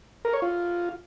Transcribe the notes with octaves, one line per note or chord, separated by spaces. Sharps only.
A#4
C#5
F4